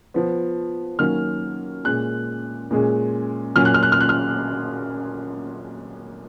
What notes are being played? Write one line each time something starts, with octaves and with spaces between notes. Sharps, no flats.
F3 B3
D#3 F#3 A#3 C#4 F6
A#2 G#3 C#4 F#6
A#2 G#3 C#4
A#2 F#3 C#4 F6
F#6
F6
F#6
F6
F#6
F6